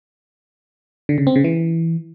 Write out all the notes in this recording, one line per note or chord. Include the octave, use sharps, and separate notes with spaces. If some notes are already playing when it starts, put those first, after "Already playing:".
D3
C#3
C4
C#3
E3